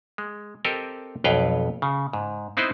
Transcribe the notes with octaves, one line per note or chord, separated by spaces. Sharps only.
G#3
C4 G4 A4 A#4 D#5
B1 F2 B4 C#5 F5 G5
C#3
G#2
B3 C4 D#4 E4 B4 C5